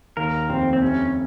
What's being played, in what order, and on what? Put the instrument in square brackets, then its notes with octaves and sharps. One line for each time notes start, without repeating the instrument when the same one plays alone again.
[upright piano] D#2 [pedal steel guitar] A#4
[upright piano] F1 [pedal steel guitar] C4
[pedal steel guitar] C4
[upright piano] C3 [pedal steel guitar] C#4